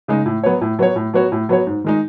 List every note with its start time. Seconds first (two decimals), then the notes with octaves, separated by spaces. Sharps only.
0.08 C#3 G#3 D#4
0.26 A2
0.44 F#3 B3 F#4 C#5
0.61 A2
0.79 F#3 B3 F#4 C#5
0.96 A2
1.14 F#3 B3 F#4 C#5
1.32 A2
1.49 F#3 B3 F#4 C#5
1.67 G#2
1.84 D#3 G#3 D#4